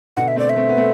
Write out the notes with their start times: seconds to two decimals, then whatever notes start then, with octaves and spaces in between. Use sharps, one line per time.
0.17 B2 D3 F#5
0.28 E5
0.36 A3 C4 D5
0.50 E5
0.56 A3 C4
0.69 B3
0.77 A3 C4